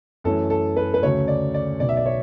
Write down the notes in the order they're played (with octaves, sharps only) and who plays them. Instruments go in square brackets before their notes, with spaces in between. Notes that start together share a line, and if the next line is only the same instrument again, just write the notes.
[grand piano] F#2 E3 A3 C#4 A4
A4
B4
B4
D2 C#3 F#3 A3 C#4 C#5
D5
D5
B1 B2 F#3 B3 D5
E5
D5
C#5